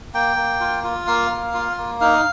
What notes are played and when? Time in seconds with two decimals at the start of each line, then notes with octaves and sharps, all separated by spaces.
0.14 A#3 G5
0.36 A#3
0.60 F4
0.84 F4
1.07 A#3 F5
1.31 A#3
1.54 F4
1.78 A#3
2.01 D#4 F5